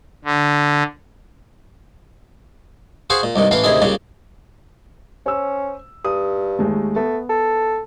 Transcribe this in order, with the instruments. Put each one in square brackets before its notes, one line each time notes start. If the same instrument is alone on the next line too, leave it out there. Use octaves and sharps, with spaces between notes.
[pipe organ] D3
[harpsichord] F#4 G#4 C5 F5 F#5
A#2
C2 G2 D#3
A1 E3 B4 F5
D2 C3 D#3 E4 G#4
A#2 C#3 G3
[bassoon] C#4 [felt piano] C5 E6
[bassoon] G2 [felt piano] D#6
[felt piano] D#2 G#3 A3
[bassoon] A3 [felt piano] B3
[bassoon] A4